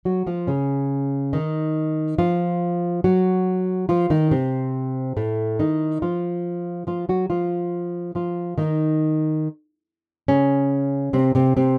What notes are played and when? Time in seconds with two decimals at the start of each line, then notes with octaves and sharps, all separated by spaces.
0.05 F#3 F#4
0.27 F3 F4
0.47 C#3 C#4
1.33 D#3 D#4
2.18 F3 F4
3.04 F#3 F#4
3.89 F3 F4
4.10 D#3 D#4
4.31 C3 C4
5.17 A2 A3
5.59 D#3 D#4
6.02 F3 F4
6.87 F3 F4
7.09 F#3 F#4
7.30 F3 F4
8.15 F3 F4
8.58 D#3 D#4
10.28 C#3 C#4
11.13 C3 C4
11.35 C3 C4
11.57 C3 C4